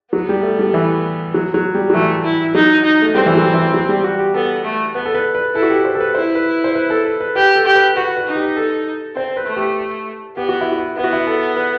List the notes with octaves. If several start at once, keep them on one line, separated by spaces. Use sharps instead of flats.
F#3 B3
G3
A3
G3
E3
F#3
F#3
G3
F#3
E3 A3
E4
F#3 D#4
D#4
A3
G3 C4
E3
F#3
E3
F#3
G3
F#4
G4
B3 A4
A3
B3 B4
A4
B4
B4
E4 A4
F#4
G4
C5
A4
B4
E4 C5
B4
C5
B4
A4
B4
B4
G4 B4
A4
G4
B4
F#4 B4
B4
D#4
G4
A4
C4 C5
B4
A3
G4
B3 G4
F#4
E4
F#4
B3 E4
F#4
E4
A4
B4